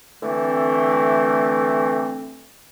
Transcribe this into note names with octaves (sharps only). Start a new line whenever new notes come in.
D3 E3 A3 C4